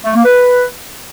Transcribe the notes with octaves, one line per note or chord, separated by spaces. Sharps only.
A3
A#3
B4